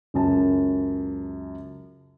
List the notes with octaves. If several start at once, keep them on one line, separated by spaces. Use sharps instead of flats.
C#2 F#2 A5